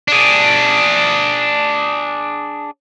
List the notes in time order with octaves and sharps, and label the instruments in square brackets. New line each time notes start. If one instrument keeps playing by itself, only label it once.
[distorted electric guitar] D4 G#4